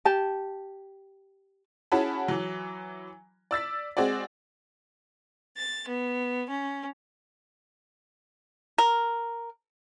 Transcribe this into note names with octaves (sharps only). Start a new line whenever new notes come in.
G4 A5
C#4 E4 F#4 G#4 A5 B5
E3 F#3
D5 E6 A6 B6
G#3 C4 F#4 G#4 D5
A6
B3
C#4
A#4